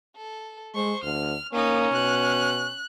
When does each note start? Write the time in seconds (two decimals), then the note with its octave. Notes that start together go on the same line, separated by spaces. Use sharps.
0.16 A4
0.75 G#3 C5 C#6
1.03 D2 F6
1.53 A#3 C#4 D#4 D#6
1.92 B2 F#6